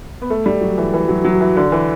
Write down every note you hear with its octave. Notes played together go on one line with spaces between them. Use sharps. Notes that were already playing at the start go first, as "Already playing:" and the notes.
B3
A3
G3
F#3
E3
E3
F#3
F#3
E3
D3
E3